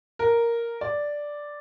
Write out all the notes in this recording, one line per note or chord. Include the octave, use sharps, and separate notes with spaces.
A#4
D5